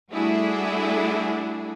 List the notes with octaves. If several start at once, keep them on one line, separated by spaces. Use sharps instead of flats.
G3 A3 D4 E4 F#4 G#4